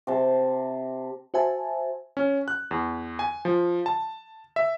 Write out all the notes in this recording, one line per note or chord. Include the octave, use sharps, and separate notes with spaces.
C3 A5
F#4 C5 E5 G#5 A5
C#4
F#6
E2
G#5
F3
A5
E5